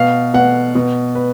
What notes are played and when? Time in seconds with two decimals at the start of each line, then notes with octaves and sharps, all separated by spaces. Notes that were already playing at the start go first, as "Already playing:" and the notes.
Already playing: B2 F5
0.34 B2 F#5
0.75 B2
1.15 B4